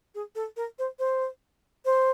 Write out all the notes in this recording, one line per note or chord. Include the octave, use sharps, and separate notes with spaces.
G#4
A4
A#4
C5
C5
C5